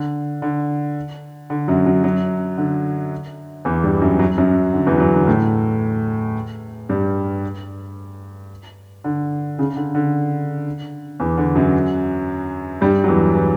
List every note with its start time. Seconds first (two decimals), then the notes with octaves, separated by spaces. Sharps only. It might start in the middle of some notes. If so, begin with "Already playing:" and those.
Already playing: D3
0.42 D3
1.50 D3
1.68 F#2 F#3
1.86 F#2 F#3
2.04 F#2 F#3
2.58 D3
3.65 E2 E3
3.84 G2 G3
4.02 F#2 F#3
4.19 F#2 F#3
4.38 F#2 F#3
4.73 D3
4.86 E2 E3
5.00 F#2 F#3
5.14 D3
5.27 A2 A3
6.89 G2 G3
9.04 D3
9.59 C#3
9.76 D3
9.95 D3
11.20 E2 E3
11.38 D3
11.55 F#2 F#3
12.81 G2 G3
13.04 F#3
13.08 E2 E3
13.35 E3